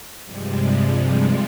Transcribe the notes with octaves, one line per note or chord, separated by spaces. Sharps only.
G2 C3 F3 G3 G#3